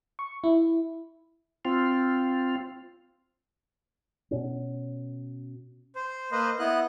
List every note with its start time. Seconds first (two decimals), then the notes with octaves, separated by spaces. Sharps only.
0.19 C#6
0.44 E4
1.65 C4 F4
4.31 B2 C#4
5.95 C5
6.32 A#3 B4 C5 D#5
6.59 B3 E4 D#5 F#6